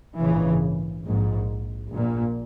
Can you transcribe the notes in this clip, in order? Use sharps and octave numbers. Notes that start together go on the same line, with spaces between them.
A#1 G#2 C#3 E3
A#1 G#2
A#1 A#2